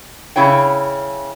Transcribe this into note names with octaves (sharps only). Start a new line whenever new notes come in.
C#3 E4 C#5 G5